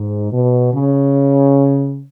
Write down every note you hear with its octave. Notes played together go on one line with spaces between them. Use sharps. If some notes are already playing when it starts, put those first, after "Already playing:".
Already playing: G#2
B2
C#3